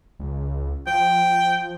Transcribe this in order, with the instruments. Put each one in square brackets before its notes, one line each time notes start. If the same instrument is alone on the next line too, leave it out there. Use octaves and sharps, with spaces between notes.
[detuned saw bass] C#2
[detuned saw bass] F3 [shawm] G5